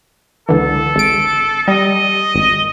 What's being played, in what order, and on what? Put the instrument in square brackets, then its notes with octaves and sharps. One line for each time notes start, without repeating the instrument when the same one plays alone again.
[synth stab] C#2 D3 E3 [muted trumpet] A4
[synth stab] G#1 D7
[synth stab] G3 [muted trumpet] D#5
[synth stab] G#1